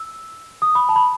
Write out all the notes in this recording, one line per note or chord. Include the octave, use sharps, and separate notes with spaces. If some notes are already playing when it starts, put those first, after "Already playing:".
Already playing: E6
D#6
B5
A5
B5